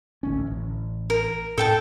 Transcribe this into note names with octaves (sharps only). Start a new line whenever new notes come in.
A1 D2 C#4
A1
A#4
A2 A4 G5 A5